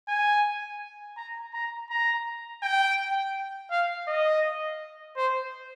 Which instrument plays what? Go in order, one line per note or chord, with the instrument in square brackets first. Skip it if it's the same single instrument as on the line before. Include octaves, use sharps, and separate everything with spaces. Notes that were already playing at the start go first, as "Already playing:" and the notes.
[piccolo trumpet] G#5
A#5
A#5
A#5
G5
F5
D#5
C5